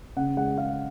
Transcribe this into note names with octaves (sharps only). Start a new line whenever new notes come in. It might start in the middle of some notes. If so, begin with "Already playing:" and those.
C#3 F#5
G#3 F#5
G#3 F5